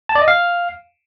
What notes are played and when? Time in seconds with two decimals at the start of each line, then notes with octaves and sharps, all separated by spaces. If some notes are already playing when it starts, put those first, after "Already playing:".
0.09 A5
0.15 D5
0.22 D#5
0.28 F5